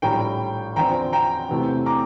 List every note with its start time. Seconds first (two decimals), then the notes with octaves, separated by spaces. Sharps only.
0.02 A#1 A2 G3 G5 A#5
0.76 E2 D3 F3 C4 G5 A#5
1.13 G5 A#5
1.49 E2 C3 E3 A3
1.86 A#5 D6